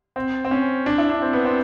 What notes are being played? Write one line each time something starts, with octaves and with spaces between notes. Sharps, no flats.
C4
C4
C#4
D4
E4
D4
C4
B3
C4